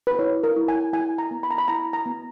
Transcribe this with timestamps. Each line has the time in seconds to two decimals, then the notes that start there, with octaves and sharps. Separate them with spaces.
0.07 B4
0.19 E4 C#5
0.43 A#4
0.56 E4
0.68 G#5
0.93 E4 G#5
1.18 A#5
1.31 B3
1.43 B5
1.51 A#5
1.58 B5
1.68 E4 A#5
1.93 A#5
2.06 B3